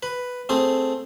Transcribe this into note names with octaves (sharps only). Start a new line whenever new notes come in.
B4
A3 C4 G#4